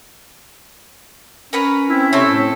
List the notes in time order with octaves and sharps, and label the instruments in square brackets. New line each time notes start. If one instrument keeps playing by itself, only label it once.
[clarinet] C#4 [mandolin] A#4 B4 C#5
[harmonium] C4 [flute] E4
[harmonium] C3 C#5 E5 [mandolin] C4 A4
[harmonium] A2